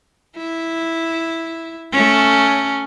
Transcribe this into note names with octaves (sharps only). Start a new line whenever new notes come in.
E4
A3 C#4